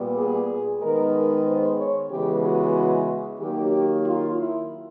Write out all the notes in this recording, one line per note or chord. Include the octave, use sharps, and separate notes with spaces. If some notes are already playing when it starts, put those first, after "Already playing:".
Already playing: A#2 G3 B3
G#4
D#3 G#3 B3 A#4
C5
C#5
C#3 E3 G#3 B3 G4
F#4
D#3 F#3 A#3 G4
F4
E4